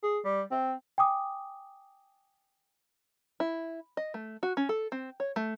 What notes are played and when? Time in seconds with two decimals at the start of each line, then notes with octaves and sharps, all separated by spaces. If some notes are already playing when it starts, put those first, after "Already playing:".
0.03 G#4
0.24 G3
0.51 C4
0.98 G5 G#5 D6 D#6
3.40 E4
3.97 D#5
4.14 A3
4.43 F#4
4.57 C#4
4.69 A4
4.92 C4
5.20 C#5
5.36 A3